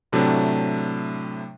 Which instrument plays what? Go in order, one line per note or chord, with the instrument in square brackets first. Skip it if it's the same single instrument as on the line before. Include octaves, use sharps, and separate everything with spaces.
[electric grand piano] A2 C3 F#3 A3 D4